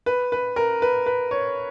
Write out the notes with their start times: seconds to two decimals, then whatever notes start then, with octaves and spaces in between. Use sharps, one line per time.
0.06 B4
0.32 B4
0.56 A#4
0.82 B4
1.06 B4
1.31 C#5